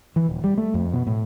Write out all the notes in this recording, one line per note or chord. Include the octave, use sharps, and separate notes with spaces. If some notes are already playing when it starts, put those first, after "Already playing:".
E3
D#1
G3
A3
F2
B2
A2